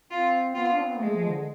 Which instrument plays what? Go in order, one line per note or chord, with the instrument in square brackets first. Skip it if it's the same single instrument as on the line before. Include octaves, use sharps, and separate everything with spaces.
[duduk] C4 [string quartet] F4
[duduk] B3 [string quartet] F4
[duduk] D4
C4
B3
[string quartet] G#3 [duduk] A3
[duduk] F3
D3